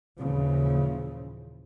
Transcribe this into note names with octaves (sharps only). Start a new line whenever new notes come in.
D#2 A#2 C#3 E3 F3